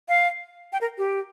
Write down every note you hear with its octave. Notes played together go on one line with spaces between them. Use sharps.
F5
G5
A#4
G4